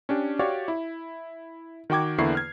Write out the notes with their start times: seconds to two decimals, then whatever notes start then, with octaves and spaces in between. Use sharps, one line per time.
0.09 C#4 D4 G4
0.39 F#4 G4 C#5 D5 F5 C#6
0.68 E4
1.90 D#3 F#4 G5 D6 G#6
2.18 E2 D3 A#3 E4 C#6 C7
2.35 F6 G#6